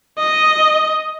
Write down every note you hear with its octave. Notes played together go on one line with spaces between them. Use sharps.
D#5